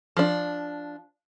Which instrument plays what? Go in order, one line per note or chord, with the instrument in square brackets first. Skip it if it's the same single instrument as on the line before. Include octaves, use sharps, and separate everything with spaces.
[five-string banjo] F3 D4